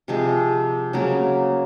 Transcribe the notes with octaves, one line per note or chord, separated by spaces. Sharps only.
C3 F3 G#3
C#3 F#3 A#3 C#4